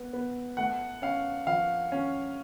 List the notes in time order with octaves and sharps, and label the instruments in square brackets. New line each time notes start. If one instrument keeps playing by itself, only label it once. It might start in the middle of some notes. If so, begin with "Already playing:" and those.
Already playing: [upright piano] B3
B3
[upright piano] A3 [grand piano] F#5
[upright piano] C#4 [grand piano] F5
[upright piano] F3 [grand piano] F5
[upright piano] C#4